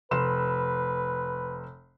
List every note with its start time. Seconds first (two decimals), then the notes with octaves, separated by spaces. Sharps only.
0.11 F1 B4 C6 E7